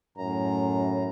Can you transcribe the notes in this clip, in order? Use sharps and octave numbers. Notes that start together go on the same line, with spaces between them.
F#2 A2 A#5